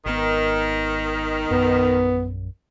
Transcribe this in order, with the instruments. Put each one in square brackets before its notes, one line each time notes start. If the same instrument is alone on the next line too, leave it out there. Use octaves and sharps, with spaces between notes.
[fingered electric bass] G#1 B3 [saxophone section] D#3
[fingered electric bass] A#1 F#2 [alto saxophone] B3